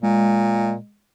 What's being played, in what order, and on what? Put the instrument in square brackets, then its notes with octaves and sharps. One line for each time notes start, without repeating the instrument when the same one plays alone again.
[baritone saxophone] A#2 [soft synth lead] G#3